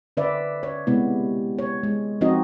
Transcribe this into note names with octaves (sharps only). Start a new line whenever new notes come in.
D3 B4 D5 E5
C#5
C3 G#3 B3 E4
C#5
G#3
F3 C4 D#4 F#4 D#5